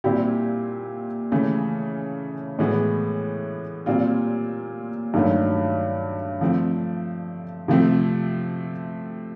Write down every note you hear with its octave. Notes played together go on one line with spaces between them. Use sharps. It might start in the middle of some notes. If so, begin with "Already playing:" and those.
A#2 G3 C4 E4 G4
C#3 E3 A3
A2 E3 G#3 B3
A#2 G3 C4 F4
G2 D#3 F#3 A3
F3 A3 C4
C3 F3 A3 C4